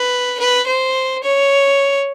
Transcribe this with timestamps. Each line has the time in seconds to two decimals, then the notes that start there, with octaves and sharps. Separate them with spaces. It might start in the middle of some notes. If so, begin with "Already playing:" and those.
Already playing: B4
0.39 B4
0.66 C5
1.23 C#5